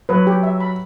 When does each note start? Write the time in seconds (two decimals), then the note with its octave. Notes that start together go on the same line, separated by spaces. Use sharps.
0.09 F#3 B4
0.27 G4
0.43 E5
0.60 B5